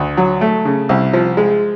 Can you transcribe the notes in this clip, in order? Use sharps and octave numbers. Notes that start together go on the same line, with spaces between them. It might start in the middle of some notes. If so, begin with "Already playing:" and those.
Already playing: D2
F#3
A3
C#3
C2
F3
G#3